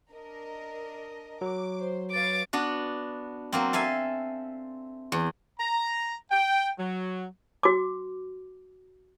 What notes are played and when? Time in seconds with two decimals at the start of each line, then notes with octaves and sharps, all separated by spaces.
0.13 D4 A#4 D#5
1.41 F#3 D6
1.79 C5
2.11 B4 C#5 F5 D6 A6
2.53 B3 D4 F#4
3.53 F#3 A#3 C4
3.73 A4 E5 F5 G#5
5.12 E2
5.58 A#5
6.31 G5
6.79 F#3
7.63 F#4 D6